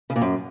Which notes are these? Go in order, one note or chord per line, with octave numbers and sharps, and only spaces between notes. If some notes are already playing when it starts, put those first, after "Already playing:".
C#3
A#2
F#2